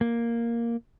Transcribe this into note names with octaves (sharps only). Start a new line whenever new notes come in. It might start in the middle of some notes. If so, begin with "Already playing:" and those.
A#3